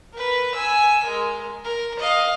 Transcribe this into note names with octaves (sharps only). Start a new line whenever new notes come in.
A#4 B4
G#5 E6
G#3 A#4
A#4
D#5 F5